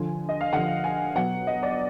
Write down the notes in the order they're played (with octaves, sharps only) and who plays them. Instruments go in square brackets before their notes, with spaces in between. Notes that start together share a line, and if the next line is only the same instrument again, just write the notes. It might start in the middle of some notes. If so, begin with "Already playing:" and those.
Already playing: [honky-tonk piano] D3 F3 G#5
D#5
F5
D3 F3 F#5
G#5
B2 F#3 F#5
D#5
D5